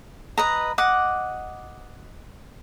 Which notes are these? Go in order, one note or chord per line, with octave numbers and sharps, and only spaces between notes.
B4 D#5 A#5
D#5 F#5 D6